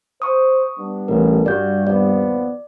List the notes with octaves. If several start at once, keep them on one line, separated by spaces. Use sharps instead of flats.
C5 C#6 D#6
G3 B3 D4
A1 A#4
G2 G3 F#4 D5 G6
D#2 F3 B3 D5